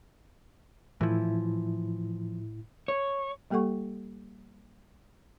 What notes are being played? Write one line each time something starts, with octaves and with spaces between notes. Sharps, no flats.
A2 E3 F3 E4
C#5
G3 A#3 G4 A4 F#5 C#6